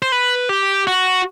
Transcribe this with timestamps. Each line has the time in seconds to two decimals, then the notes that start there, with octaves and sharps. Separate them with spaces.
0.02 C5
0.12 B4
0.49 G4
0.87 F#4